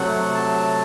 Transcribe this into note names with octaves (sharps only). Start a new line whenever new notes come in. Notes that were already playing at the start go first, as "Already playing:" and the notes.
Already playing: C3 F#3 A3 F#5
A5